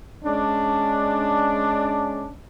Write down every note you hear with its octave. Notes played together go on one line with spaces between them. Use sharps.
G#3 C#4 D4